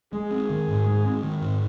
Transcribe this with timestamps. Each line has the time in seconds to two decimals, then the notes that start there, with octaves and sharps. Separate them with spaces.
0.13 G#3 G#4
0.31 C4
0.50 D#3
0.68 G#2
0.86 G#3
1.05 C4
1.23 D#3
1.42 G#2